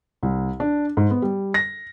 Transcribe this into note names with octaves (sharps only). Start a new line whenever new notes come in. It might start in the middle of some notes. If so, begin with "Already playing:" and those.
C2
D4
G#2
B3
G3
A#6